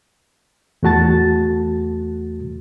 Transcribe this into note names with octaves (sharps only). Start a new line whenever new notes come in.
E2 A3 F#4 A5 A6